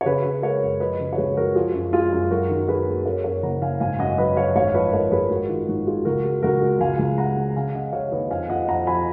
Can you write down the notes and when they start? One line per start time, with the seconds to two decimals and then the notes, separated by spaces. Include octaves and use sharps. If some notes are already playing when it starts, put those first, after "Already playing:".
0.01 C#5
0.06 C#3 G#4 B4
0.24 C#3
0.42 G#3 A#4 C#5
0.62 F#2
0.80 F3 B4 D#5
1.00 C#3
1.13 C#5
1.18 C#2 G#4 B4
1.37 C#3 F#4 A#4
1.55 F3 F4 G#4
1.74 F#2
1.93 G#3 F4 G#4
2.12 F#2
2.30 F#3 F#4 A#4
2.50 D#3
2.68 D#3 G#4 B4
2.87 A#3
3.06 F#2 A#4 C#5
3.24 F#2 A#4 C#5
3.43 F#1 F#5 A#5
3.62 F#1 F5 G#5
3.80 G#1 F5 G#5
3.99 F#2 D#5 F#5
4.18 F#3 B4 D#5
4.36 F#3 C#5 F5
4.56 G#1 C#5 F5
4.67 F5
4.74 F3 B4 D#5
4.93 G#1 A#4 C#5
5.12 G#1 G#4 B4
5.30 G#2 F#4 A#4
5.49 D#3 F4
5.68 G#1 D#4 F#4
5.87 D#3 F4 G#4
6.05 C#2 F#4 A#4
6.25 G#3
6.43 C#2 F#4 A#4
6.62 G#3
6.80 C#2 F5 G#5
6.99 C#2
7.18 G#3 F#5 A#5
7.37 G#3
7.56 C#3 F5 G#5
7.75 C#3 D#5 F#5
7.93 C#3 C#5 F5
8.11 D#2 B4 D#5
8.31 F2 F5 G#5
8.50 F2 D#5 F#5
8.68 F2 F#5 A#5
8.87 F3 G#5 B5